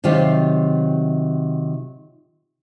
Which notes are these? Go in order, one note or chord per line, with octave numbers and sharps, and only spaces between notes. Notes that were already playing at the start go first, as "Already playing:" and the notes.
C3 D#3 F#3 F4 G4 F5